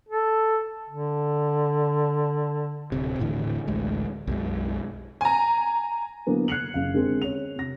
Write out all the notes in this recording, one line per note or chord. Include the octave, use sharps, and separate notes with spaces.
A4
D3
D1 C3
D#1 A2 D3 E3
A1 D2 G#3
B1 F#2 G#3
G#5 A#5
D3 F#3 A#3 B3 E4
F#6 G#6 C7 C#7 F7 F#7
F#1 F5
D3 G#3 C4 A#4
C#4 C#5 F7
C3 A#6